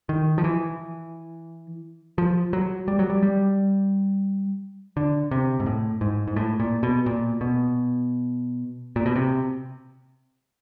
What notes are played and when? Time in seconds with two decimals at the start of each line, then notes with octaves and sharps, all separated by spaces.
0.09 D#3
0.38 F3
0.44 E3
2.18 F3
2.53 F#3
2.88 G3
2.99 F#3
3.10 G3
3.23 G3
4.97 D3
5.31 C3
5.60 G#2
5.66 A2
6.01 G#2
6.28 G#2
6.36 A2
6.60 A#2
6.83 B2
7.06 A#2
7.41 B2
8.96 A#2
9.06 B2
9.16 C3